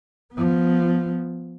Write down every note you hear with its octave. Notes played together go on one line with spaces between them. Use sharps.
F3 B3